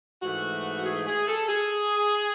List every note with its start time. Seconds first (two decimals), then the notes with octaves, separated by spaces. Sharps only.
0.22 G#2 E3 A3 F#4
0.85 G#4
1.07 G#4
1.27 A4
1.48 G#4